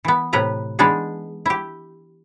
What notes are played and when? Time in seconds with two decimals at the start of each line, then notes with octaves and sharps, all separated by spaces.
0.05 E3 B3
0.33 A2 C3 B4 A#5
0.79 E3 G#3 B3 D4 D#4 G#4
1.46 E4 G4